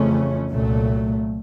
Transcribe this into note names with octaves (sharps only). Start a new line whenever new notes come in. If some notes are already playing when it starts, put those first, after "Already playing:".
Already playing: F2 C#3 E3 A3 C#4
C2 A#2 F#3 A3